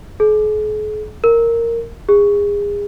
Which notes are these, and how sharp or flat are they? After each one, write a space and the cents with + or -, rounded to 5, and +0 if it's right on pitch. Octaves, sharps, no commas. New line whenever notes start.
G#4 +45
A#4 -10
G#4 -30